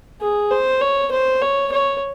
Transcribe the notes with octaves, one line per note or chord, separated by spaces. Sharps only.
G#4
C5
C#5
C5
C#5
C#5